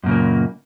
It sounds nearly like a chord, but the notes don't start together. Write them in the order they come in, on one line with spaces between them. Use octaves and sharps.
F#2 A#2 C#3 A#3